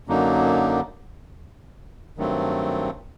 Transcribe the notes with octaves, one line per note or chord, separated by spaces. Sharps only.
F#2 D3 F#3 A#3 D#4
G2 D#3 F#3 A3 C4